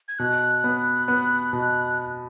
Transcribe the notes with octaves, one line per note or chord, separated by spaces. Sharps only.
G#6
B2 F#6
B3
B3
B2